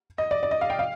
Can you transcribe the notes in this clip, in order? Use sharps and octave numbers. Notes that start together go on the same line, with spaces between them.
D#5
D5
D5
D#5
F5
G5
F5